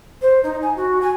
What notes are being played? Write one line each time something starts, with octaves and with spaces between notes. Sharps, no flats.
C5
D#4
G#5
F#4
G#5